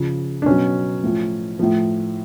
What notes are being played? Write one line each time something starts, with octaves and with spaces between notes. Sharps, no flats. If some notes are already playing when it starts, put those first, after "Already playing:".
Already playing: C#3 F3
D4
B2 F#3 C#4
A2 F3
A2 F3